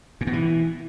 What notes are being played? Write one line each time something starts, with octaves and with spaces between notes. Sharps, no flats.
A#2
B2
E3